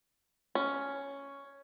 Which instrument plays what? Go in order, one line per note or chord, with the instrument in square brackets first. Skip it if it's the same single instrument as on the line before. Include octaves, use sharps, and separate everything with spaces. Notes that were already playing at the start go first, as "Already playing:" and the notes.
[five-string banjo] C#4